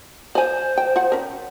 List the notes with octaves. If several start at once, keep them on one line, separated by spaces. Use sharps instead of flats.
C5 D5 G#5
G5
F4 F#5
C#4 A#4